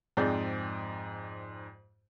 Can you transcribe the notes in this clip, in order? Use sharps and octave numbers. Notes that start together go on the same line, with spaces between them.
F2 G#2 C4 G#4 D5 G6